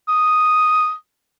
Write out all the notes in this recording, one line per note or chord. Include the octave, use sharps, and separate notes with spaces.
D#6